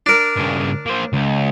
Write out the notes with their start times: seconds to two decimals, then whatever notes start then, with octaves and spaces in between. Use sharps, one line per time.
0.06 D4 A#4
0.36 G2 C#3
0.86 A#3 C5
1.13 C#2